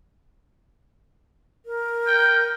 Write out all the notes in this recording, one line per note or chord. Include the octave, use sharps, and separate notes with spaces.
A#4
G5